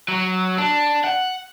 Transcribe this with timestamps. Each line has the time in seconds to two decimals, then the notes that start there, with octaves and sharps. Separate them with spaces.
0.08 F#3
0.58 D4
1.05 F#5